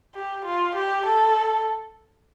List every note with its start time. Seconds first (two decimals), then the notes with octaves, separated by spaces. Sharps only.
0.15 G4
0.45 F4
0.75 G4
1.06 A4